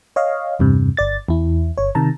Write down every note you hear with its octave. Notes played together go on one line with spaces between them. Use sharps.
C#5 D#5 F5
E2 G2 C3
G1 D5 A6
E2 E4
G1 C#5
C3 D#3 A5 A#5